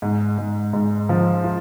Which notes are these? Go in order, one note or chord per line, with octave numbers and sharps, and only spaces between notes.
G#2
G#2
G#2
F3
F4